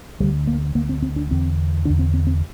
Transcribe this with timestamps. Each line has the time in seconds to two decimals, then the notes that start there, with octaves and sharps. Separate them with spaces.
0.20 D2 G3
0.24 D3
0.47 A#3
0.75 D2 D3 A#3
0.89 C4
1.03 C4
1.16 D4
1.31 E2 D3 C4
1.85 E2 D3 D4
1.99 C4
2.14 C4
2.27 C4